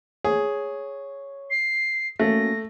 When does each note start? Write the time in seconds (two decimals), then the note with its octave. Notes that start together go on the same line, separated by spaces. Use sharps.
0.24 G#4 C#5
1.51 C7
2.19 A3 A#3 C#4 F#4 A#6